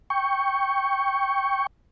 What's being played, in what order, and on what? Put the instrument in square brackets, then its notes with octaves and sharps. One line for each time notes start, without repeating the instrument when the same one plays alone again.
[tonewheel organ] G5 C#6